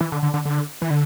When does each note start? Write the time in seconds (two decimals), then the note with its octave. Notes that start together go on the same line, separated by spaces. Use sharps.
0.01 E3
0.12 D3
0.23 D3
0.34 D3
0.45 D3
0.82 E3
0.90 D3